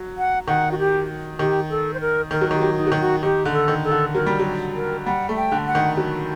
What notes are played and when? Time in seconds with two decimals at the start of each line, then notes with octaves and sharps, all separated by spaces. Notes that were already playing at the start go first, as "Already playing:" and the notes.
Already playing: F#3
0.18 F#5
0.48 D#3 F#5
0.72 F#4
0.78 G4
1.39 D#3 G4
1.70 A4
1.94 C5
2.00 A#4
2.31 D#3 A#4
2.41 F#3
2.51 D#3 G4
2.61 F#3
2.77 D#4
2.87 F#3
2.92 D#3
3.00 F#4
3.22 D#3 G4
3.45 D3
3.53 A4
3.68 D#3
3.84 A4
3.91 D3
4.15 F#3 A#4
4.27 G3
4.39 F#3
4.75 A#4
5.06 G3 F#5
5.29 A3
5.36 G5
5.52 D3
5.67 F#5
5.75 D#3
5.97 F#3